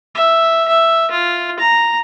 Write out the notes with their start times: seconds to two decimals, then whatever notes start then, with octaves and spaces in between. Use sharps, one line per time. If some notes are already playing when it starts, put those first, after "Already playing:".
0.15 E5
0.68 E5
1.11 F4
1.59 A#5